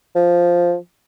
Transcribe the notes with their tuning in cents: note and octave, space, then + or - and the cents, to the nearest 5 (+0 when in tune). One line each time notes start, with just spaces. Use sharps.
F3 +0